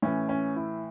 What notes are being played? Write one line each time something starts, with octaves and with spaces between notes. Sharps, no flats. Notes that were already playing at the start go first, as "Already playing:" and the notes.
A2 E3 C#4
C#4
E4